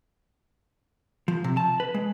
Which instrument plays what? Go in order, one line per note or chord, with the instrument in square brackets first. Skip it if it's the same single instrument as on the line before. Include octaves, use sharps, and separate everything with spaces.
[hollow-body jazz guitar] F3
C3
A5
B4
G#3